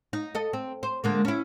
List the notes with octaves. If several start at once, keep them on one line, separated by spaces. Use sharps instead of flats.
D#4
A4 D#5
C4
C5
D3 G#3 A#3
C#4 E4